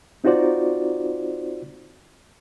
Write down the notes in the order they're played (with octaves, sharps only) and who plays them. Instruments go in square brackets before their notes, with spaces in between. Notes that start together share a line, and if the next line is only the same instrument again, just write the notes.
[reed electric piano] C4 D#4 F4 F#4 C5 D5